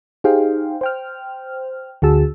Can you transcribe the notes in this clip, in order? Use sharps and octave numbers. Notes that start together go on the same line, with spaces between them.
D#4 G4 G#4 C5 F5 G5
C5 G5 F6
D2 D3 F#4 G#4 A5 E6